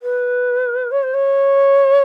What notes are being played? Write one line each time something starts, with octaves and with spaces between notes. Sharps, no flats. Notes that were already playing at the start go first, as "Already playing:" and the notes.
B4
C#5
C5
C#5